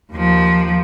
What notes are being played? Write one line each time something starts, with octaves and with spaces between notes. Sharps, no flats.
D#2 F3